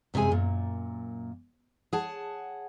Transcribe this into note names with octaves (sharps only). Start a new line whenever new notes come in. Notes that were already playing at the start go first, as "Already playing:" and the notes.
F#2 C3 G#3 G#4 G#5
F#2 A#2
G#4 C#5 F#5 A5